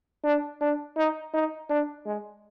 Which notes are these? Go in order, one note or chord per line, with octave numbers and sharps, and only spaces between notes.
D4
D4
D#4
D#4
D4
G#3